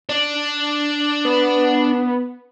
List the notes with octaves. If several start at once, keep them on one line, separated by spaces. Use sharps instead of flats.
D4
B3